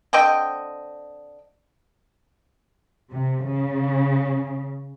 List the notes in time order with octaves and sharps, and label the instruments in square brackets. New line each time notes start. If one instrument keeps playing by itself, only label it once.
[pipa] D3 C4 D#5 G5
[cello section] C3
C#3